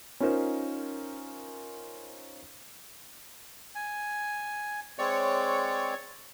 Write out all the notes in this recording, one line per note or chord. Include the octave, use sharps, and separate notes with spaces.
C#4 D#4 F4 A#4 C5
G#5
G#3 C4 C#5 D5